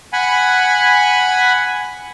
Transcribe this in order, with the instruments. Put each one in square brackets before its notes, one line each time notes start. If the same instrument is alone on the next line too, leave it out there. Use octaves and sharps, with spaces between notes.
[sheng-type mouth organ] F#5 G#5 B5